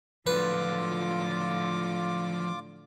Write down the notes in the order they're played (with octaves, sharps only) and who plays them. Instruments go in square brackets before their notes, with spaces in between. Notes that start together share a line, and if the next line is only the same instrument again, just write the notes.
[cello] A2 D3 [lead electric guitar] F3 F#3 [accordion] F4 D6 [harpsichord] B4